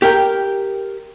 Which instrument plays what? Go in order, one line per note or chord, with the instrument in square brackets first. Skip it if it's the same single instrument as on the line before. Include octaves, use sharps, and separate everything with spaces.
[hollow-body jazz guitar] G4 A#4 G5